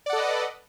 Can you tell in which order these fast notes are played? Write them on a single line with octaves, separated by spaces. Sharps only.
D5 F#5 A4 D#5 B4